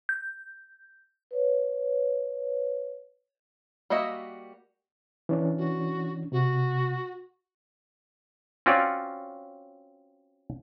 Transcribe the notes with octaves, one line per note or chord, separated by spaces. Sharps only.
G6
B4 C#5
G3 A#3 F#4 D#5 E5
E3 C#4 D4
F#4
C3 F#4
C4 C#4 F4 F#4 C#5 D5